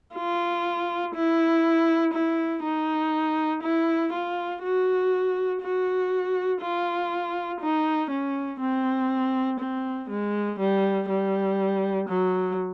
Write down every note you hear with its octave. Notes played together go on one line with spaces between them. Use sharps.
F4
E4
E4
D#4
E4
F4
F#4
F#4
F4
D#4
C#4
C4
C4
G#3
G3
G3
F#3